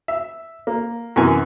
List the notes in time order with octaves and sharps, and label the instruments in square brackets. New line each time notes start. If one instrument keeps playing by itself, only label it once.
[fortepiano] E5
A#3
F#2 C3 E3 B3 A#4 G#5